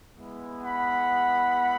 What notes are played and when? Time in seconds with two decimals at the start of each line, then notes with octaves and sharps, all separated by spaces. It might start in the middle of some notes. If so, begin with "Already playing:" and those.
0.15 G#3 B3 E4
0.62 F#5 B5